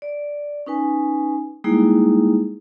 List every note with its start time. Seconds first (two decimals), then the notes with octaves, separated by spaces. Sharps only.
0.02 D5
0.66 C#4 D#4 B4 G#5
1.64 G3 G#3 A#3 D#4 E4 G#4